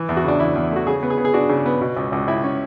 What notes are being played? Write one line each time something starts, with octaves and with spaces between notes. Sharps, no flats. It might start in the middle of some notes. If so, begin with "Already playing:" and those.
Already playing: E3
E2
F#4
C#3 D4
E2 E4
E2
A3 F#4
C#3 G#4
B3
G#4
B3
G#4
D4 F#4
C#3
B3
B2
C#2
C#2
C#2 E4
C#4